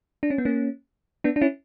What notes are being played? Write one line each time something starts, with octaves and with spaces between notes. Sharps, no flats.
D4
C#4
B3
A#3 C#4
B3 D4
D4
C#4 E4